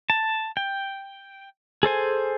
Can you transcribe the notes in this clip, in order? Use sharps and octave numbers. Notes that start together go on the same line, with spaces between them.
A5
G5
G#4 A4 C5 G#5